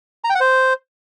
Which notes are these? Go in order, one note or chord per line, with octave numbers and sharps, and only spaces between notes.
A#5
G5
F#5
C5